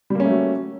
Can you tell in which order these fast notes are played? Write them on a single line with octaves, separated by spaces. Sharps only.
G3 A#3 C#4 A3 F#3